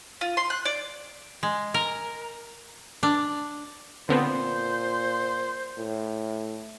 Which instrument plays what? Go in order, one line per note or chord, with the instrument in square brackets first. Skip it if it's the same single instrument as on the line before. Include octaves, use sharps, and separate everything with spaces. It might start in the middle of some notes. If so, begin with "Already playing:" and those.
[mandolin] F4
C6
F#6
D5
[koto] G#3
A#4
D4
[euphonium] A#2 [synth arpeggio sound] D3 B3 C4 [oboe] C5
[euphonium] A2